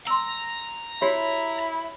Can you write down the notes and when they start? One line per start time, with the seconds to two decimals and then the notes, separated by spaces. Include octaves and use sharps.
0.07 A#5 C6 E6
1.02 E4 F#4 G4 C#5